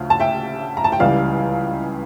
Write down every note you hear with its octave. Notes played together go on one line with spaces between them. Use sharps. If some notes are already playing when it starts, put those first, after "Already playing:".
Already playing: D2 C#3 F3 A3 F5
A5
E5 G5
A#5
A5
G5
C#2 C#3 E3 G3 D5 F5